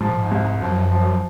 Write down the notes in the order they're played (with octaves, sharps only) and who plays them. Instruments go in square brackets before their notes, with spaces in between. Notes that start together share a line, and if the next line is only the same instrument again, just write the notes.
[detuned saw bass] G#2 [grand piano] F3
[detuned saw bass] A#2
G#2
[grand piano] C2
[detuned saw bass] F#2 [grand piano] F3
[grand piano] F3